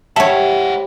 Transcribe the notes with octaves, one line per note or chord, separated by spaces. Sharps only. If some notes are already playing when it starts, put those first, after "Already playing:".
G3 C5 C#5 E5 F#5 A5